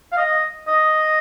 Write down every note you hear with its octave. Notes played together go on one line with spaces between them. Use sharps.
F5
D#5
D#5